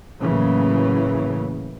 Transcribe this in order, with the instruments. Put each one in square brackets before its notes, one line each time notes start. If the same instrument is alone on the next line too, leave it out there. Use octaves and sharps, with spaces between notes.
[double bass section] A2 C#3 E3 F#3 A#3